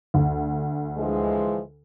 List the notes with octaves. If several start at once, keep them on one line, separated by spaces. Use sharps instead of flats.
D2
E3 F3 G#3